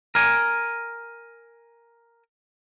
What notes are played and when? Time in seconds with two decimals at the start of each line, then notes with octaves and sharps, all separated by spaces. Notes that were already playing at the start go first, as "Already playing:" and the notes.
0.15 A#4 G#5